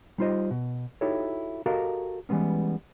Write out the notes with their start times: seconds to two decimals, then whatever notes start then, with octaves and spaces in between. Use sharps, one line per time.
0.18 G3 D#4 F4 A4 C5 D#5
0.51 B2
1.01 D#4 E4 F#4 G4 A4 C#5
1.66 F#4 G4 A4 A#4 D#5 F5
2.29 E3 G3 G#3 B3 C#4